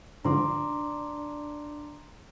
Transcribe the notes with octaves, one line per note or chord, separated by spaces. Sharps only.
G#2 D3 F3 D4 A#5 C6 D6